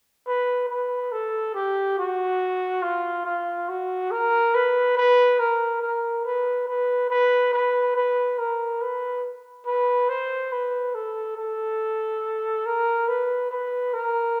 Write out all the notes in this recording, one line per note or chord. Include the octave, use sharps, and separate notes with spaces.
B4
B4
A4
G4
F#4
F4
F4
F#4
A#4
B4
B4
A#4
A#4
B4
B4
B4
B4
B4
A#4
B4
B4
C5
B4
A4
A4
A#4
B4
B4
A#4